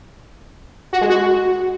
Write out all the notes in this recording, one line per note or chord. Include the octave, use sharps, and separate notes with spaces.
F#4
G#3
F#4